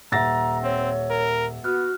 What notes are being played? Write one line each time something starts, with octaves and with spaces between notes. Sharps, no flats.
D#1 E5 F#5 A#5 E6 A6 A#6
C4 C#5
A#4
B3 F#4 F6 F#6